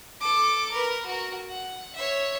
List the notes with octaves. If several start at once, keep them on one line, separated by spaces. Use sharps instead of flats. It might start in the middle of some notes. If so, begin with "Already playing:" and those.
A4 D6
A#4 B4
F#4 A#4
F#5
C#5 E5